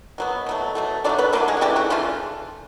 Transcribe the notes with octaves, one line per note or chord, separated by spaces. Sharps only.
B2 F#3 B3
B2 F#3 A3
B2 F#3 A3
D3 F#3 A3 D4 D5
B3 B4
D3 F#3 A3 A#3 A#4
G#3 G#4
F#4
C#3 E3 G3 A3 G4
F#3 F#4
C#3 E3 F3 A3 F4